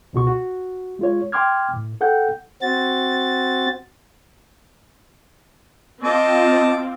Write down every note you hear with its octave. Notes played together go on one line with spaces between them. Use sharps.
C#2 B2 F#4 C#6
F#4
G#3 F4 C#5
G5 C6 D6 F6 G#6
A2
A4 F#5 G5 G6
C4 F#4 A6
C4 F4 D#5 A5 D6